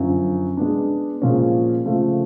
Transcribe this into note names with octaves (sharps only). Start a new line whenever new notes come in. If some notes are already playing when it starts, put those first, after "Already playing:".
Already playing: F#2 D3 F3
G#3 B3 D4
A#2 F3 G#3 C#4
C#3 F3 A3